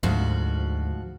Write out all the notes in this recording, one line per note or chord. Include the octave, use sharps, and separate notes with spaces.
D2 G#2 F3 F#4